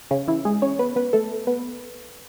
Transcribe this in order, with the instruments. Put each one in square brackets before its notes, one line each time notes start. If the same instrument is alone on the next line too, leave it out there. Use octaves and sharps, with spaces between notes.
[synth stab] C#3 C#4
E3 E4
G#3 G#4
C#4 C#5
B3 B4
B3 B4
A3 A4
B3 B4